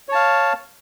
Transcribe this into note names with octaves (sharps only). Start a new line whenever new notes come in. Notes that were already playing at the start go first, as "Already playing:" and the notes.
C#5 F5 A5